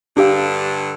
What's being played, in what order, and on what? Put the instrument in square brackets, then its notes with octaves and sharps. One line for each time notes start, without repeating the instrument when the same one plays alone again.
[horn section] G2 D3 [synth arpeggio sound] D4 G4 F5